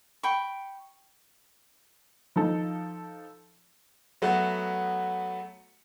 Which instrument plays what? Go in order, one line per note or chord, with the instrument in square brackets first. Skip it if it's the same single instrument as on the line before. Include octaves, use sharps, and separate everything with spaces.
[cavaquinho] G5 B5 C#6
[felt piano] F3 D#4 A4
[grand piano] F#3 A3 B3 F#4